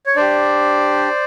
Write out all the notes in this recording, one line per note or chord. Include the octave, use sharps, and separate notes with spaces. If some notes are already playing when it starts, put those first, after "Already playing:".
C#5
D4 G4 C5 D5